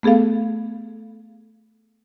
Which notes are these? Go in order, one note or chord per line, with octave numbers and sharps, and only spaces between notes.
A3 B3 G#4 A4 F5